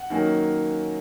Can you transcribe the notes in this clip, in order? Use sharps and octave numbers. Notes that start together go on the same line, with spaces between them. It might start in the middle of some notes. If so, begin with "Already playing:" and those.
Already playing: F#5
D#3 F#3 A#3 C#4